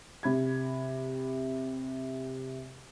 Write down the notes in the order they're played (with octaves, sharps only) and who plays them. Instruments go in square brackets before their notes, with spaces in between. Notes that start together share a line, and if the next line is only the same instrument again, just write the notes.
[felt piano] C3 B5 G#6